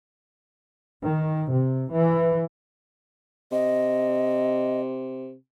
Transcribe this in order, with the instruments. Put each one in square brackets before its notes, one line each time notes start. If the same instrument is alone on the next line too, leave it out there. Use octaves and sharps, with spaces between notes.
[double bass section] D#3
C3
E3
[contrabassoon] C3 [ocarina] D#5